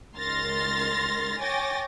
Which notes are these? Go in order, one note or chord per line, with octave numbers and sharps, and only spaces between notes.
C#2 D#3 C6 F6 A6 A#6
C#5 G5 G#5 D6 A6 A#6